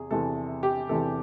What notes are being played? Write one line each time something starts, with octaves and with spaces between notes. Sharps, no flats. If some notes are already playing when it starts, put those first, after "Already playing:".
Already playing: E2 C3 G#4
E2 C3 E3 A4
G4
E2 C3 E3 A4